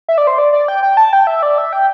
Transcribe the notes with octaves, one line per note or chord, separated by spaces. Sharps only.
E5
D5
C5
D5
D5
G5
G5
A5
G5
E5
D5
E5
G5